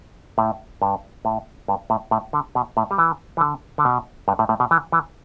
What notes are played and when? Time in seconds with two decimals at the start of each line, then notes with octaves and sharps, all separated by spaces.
0.38 A2
0.82 G2
1.25 A2
1.68 G2
1.90 A2
2.11 A2
2.33 D3
2.55 B2
2.77 A2
2.91 G3
2.98 E3
3.37 E3
3.41 D3
3.78 D3
3.85 B2
4.28 G2
4.39 A2
4.49 A2
4.60 B2
4.71 E3
4.92 E3